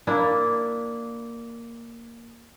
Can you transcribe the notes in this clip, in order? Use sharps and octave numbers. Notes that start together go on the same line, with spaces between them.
A#3 D4 E4